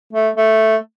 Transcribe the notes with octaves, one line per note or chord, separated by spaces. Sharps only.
A3
A3